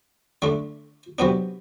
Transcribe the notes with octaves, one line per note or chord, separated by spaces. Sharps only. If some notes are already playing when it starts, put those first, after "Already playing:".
D3 A3 D4
C3 F#3 B3 D4